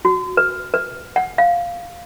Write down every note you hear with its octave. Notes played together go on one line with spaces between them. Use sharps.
F#4
B4
B4
F#5
F5